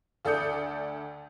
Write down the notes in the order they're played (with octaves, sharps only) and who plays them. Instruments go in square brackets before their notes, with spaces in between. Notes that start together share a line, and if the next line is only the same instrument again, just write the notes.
[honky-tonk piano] D2 A4 D5 D#6 G6 C#7